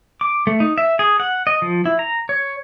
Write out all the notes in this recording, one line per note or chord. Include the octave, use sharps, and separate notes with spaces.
D6
A3
D#4
E5
G#4
F#5
D#5
F3
E4
A#5
C#5